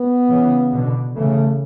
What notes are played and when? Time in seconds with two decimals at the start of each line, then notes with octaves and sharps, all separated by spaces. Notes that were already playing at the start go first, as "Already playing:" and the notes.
Already playing: B3
0.30 C#3 E3
0.73 B2 D3
1.16 C#3 E3 A3